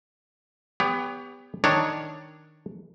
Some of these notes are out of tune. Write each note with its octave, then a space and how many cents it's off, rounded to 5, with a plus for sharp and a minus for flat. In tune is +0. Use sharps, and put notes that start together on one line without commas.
B3 +15 G4 +35 C#5 +40
D#3 +0 D4 +0 C#5 +0